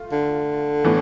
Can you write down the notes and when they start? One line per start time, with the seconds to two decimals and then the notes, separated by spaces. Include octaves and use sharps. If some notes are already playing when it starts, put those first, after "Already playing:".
Already playing: A3 F4
0.12 D3
0.84 A2 E3 B3